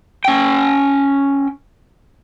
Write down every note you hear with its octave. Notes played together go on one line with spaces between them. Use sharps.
C#4 G5